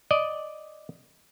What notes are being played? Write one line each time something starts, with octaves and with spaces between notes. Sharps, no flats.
D5 D#5